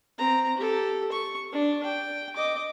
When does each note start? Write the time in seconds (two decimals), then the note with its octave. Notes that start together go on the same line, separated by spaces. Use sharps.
0.19 C4 A#5
0.57 G4 A4
1.12 C#6
1.52 D4
1.84 G5
2.36 D#5 D6